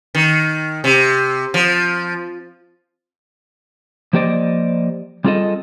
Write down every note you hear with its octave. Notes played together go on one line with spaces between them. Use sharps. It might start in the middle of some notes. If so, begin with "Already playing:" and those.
D#3
C3
F3
F3 A#3 G4 C5 D5 D#5
G3 C4 F4 G#4 A4 D#5